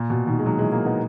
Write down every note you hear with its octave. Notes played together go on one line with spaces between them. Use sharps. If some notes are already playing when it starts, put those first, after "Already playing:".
Already playing: A#2
B2
B2 D#3
G#3
D#3 F#3
E3 G#3
F#3 A#3
B3 D#4